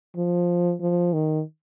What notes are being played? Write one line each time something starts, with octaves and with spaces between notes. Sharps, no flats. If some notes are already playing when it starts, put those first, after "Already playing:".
F3
F3
D#3